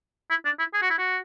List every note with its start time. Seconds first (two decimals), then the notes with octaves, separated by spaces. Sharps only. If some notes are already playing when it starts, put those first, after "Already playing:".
0.30 E4
0.45 D4
0.59 E4
0.74 G#4
0.82 F#4
0.90 E4
0.98 F#4